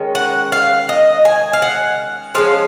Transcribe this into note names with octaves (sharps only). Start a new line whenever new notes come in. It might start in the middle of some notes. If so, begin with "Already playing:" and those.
Already playing: D#3 G#3 C#4
F#5
F5
D#5
G#5
F5
F#5
F3 G#3 C#4 F5